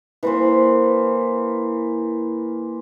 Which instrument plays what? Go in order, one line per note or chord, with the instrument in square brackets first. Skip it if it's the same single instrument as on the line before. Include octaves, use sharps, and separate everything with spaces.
[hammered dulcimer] E3 A#3 C5